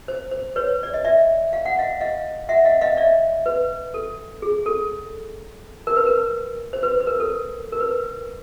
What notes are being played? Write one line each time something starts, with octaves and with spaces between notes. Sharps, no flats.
C5
C5
B4 C#5
D5
D#5
D5 E5
F5
F#5
D#5 F5
D#5 F5
E5 F#5
D#5 F5
D#5 F5
D5 E5
B4
A4
G#4
A4
A#4
B4
A#4
C5
B4
B4
A#4
A4
A#4
B4